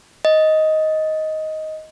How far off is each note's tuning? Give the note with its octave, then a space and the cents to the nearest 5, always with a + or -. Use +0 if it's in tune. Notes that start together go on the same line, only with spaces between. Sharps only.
D#5 +10